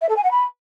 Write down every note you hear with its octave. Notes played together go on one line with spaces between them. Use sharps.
E5
A4
G#5
F#5
B5